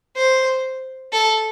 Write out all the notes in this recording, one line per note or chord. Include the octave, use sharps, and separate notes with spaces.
C5
A4